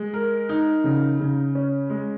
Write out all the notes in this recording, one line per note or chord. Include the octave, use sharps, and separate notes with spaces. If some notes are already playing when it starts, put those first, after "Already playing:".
Already playing: G#3
A#4
D#4
C#3
C#3
C#4
G#3